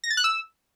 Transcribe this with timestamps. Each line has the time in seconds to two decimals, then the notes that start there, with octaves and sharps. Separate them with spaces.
0.04 A#6
0.10 A6
0.17 F#6
0.24 E6